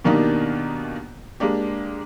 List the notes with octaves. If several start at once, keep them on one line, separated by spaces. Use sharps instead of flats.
B2 D#3 A#3 D4 D#4 G4
G#3 A#3 D4 G4